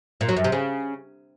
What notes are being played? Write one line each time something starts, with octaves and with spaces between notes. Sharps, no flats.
A#2
F#3
F#2
C3
C#3